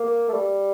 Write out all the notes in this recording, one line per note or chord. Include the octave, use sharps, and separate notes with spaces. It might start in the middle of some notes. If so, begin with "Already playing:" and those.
Already playing: A#3
A3
G3